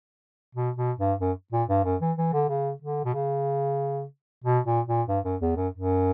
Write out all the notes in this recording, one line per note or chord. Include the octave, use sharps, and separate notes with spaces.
B2
B2
G2
F#2
A#2
G2
F#2
E3
E3
D3
C#3
D3
B2
C#3
B2
A#2
A#2
G2
F#2
E2
F#2
F#2